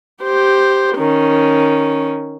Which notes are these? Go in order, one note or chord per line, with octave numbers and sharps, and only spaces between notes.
G4 C5
D#3 C#4